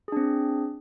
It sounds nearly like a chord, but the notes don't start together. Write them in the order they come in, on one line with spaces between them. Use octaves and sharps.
G#4 D4 C4